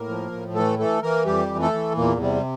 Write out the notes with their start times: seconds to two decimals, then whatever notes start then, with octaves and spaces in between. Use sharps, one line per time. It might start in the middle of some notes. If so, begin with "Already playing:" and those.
Already playing: A2 A#3 A#4
0.09 F3
0.32 A2
0.55 E3 A3 A4
0.79 E3 A3 A4
1.02 E3 A#3 A#4
1.26 F2 G3 G4
1.49 E3
1.61 A3 A4
1.73 E3
1.97 E2 A#2 A#3
2.20 C3 G3